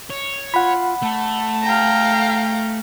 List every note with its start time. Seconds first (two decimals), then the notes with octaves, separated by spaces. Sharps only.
0.10 C#5
0.54 F4 F#5 B5
1.03 A3 A5
1.63 F5 G5 A#5